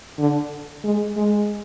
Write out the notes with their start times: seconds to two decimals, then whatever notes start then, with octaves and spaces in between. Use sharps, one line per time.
0.19 D3
0.84 G#3
1.17 G#3